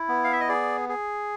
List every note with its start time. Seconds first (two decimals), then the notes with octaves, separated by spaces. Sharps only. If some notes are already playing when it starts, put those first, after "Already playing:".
Already playing: E4
0.08 B3
0.24 F5
0.33 E5
0.40 D#5
0.48 G#4 D5
0.89 G#4